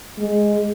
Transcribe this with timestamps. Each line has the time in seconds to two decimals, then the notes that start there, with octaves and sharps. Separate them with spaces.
0.19 G#3